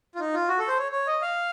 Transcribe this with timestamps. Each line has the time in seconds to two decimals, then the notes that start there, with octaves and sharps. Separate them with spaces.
0.15 F4
0.20 D#4
0.34 F4
0.49 F#4
0.59 A4
0.68 C5
0.78 C#5
0.92 C#5
1.07 D#5
1.22 F5